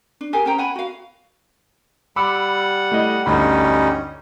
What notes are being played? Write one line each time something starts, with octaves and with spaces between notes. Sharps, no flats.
D4
G4 G#4 A#4 G#5
C#4 C5 G5 A#5
F#5 G#5 B5
F#4 F5
G3 F#5 B5 D6 E6
A3 E4 D#5
G1 D2 G3 C#4 D#4 B5